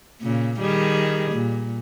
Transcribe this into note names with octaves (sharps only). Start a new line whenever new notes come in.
A#2 C#3
D#3 G3 G#4
A#2